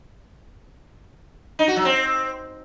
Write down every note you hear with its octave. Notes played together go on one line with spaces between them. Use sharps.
D#4
F#4
F#3
C4